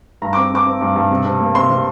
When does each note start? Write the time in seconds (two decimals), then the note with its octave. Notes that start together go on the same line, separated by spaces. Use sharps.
0.22 G2 A#5
0.33 D6
0.36 C4
0.52 C4 D6
0.66 C4
0.81 G2
0.96 G2
1.11 C3
1.25 C3
1.40 A#3
1.55 C3 C6
1.70 C3